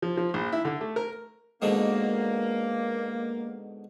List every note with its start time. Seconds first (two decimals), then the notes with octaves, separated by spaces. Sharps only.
0.02 F3
0.17 F3
0.34 A#1
0.53 E4
0.65 D3
0.81 A3
0.96 A#4
1.62 G#2 B2 D3 A#3